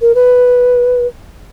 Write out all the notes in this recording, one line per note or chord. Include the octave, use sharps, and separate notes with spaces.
A#4
B4